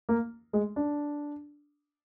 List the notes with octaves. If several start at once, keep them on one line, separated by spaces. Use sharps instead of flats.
A#3
G#3
D4